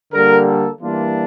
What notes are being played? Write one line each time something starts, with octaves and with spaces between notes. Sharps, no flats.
D3 G3 A#3 A#4
A4
E3 G3 A#3 D4 F4